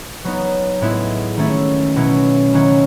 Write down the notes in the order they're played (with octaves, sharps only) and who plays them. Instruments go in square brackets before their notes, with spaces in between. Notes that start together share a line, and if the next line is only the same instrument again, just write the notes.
[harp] F#3 B3 D#4
A2 G#3 B3 E4
D#3 A3 C#4 E4
B2 F#3 C#4 E4
D#3 F#3 C#4 E4